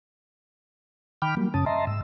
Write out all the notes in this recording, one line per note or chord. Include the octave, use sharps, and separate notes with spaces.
D#3 G5 B5 D6 F6
F#3 G3 A#3
F#2 C#3 C#4 A5 D#6
D#5 E5 A5 A#5 C6
G#2 E6